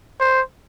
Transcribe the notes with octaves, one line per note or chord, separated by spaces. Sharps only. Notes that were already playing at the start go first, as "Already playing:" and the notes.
C5